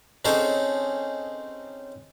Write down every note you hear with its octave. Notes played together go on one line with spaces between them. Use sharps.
C4 C#4 D#4 G#4 A4 C#5